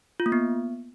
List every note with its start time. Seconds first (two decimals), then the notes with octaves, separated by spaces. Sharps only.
0.20 F4
0.26 A#3
0.32 B3